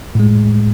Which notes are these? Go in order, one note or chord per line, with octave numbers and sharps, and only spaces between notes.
A2 G#3